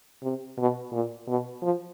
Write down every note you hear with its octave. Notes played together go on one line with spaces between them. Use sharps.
C3
B2
A#2
B2
F3